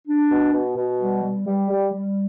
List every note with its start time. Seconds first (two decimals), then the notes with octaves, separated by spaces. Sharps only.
0.07 D4
0.30 B2
0.52 B2
0.75 B2
0.99 G3
1.23 G3
1.46 G3
1.69 G3
1.91 G3